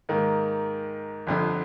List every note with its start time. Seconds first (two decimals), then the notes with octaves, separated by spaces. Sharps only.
0.09 G#2 D#3 A#3
1.27 G1 F2 D3